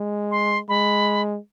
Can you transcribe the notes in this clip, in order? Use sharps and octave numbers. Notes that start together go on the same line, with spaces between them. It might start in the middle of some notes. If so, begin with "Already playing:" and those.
Already playing: G#3
C6
G#3 B5